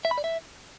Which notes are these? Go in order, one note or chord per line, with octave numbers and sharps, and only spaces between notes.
E5
B5
D5
E5